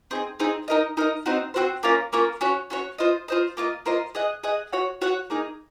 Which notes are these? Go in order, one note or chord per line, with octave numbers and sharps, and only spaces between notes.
C4 D#4 G#4
C4 D#4 G#4
D#4 A#4 D#5
D#4 A#4 D#5
C4 D#4 F#4 C5
C4 D#4 F#4 C5
A#3 C#4 F4 A#4
A#3 C#4 F4 A#4
C#4 F#4 C#5
C#4 F#4 C#5
F4 C5 D#5
F4 C5 D#5
A#3 F4 C5 D#5
A#3 F4 C5 D#5
G#4 D#5 F#5
G#4 D#5 F#5
F#4 C#5 F#5
F#4 C#5 F#5
A#3 D#4 G#4